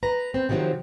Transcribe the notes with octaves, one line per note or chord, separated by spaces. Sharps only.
B4 A#5
C4
C3 D#3 F3 F#3 C4